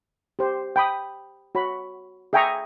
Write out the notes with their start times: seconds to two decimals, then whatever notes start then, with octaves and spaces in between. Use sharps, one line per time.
0.39 G4 C5
0.76 G5 B5 D#6
1.55 F#4 C#5 B5
2.33 G#4 E5 G5 G#5 A#5 C#6